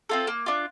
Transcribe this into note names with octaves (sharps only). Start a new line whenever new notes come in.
C4 F4 A4
A#3
D4 F4